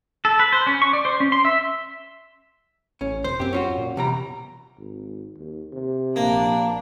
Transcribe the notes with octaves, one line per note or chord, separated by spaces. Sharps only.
A4
B4
C5
C#4
C#6
D5
C5
C#4
C6
E5
A1 C#4
F1 C5
F#2 C4 G4
C#4 F4 F#4
A#2
E2 C3 G3 A#5
G#1
D#2
C3
A#1 A#3 D4